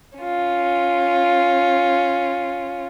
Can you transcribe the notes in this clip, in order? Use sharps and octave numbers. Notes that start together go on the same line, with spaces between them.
C#4 F4